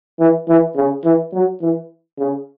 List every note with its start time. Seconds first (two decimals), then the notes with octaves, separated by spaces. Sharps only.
0.20 E3
0.48 E3
0.76 C#3
1.05 E3
1.33 F#3
1.62 E3
2.18 C#3